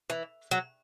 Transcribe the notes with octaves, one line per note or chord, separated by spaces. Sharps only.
E3
F#3